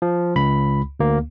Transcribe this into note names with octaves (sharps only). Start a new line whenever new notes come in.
F3
C#2 B5
D2 A#3